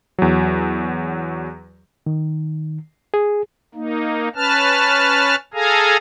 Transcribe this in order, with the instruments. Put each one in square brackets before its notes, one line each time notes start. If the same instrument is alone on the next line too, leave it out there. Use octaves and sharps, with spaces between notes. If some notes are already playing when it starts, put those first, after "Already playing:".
[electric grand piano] E2 F#3
[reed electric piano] D#3
G#4
[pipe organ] A#3 D#4
C#4 B4 A5 F6
G#4 A4 F5 G#5 A#5